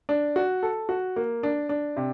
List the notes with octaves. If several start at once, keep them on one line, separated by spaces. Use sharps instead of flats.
D4
F#4
A4
F#4
A#3
D4
D4
C3